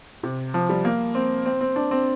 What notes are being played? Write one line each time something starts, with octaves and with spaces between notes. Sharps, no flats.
C3
F3
G3
A#3
C4
C4
C4
D4
C4